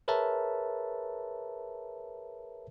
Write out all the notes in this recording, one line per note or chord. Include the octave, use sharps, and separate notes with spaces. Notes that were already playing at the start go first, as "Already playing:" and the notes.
G#4 A#4 B4 C#5 E5 A5